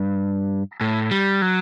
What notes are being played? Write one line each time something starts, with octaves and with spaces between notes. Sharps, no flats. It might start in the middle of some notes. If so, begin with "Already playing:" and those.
Already playing: G2
A2
G3
F#3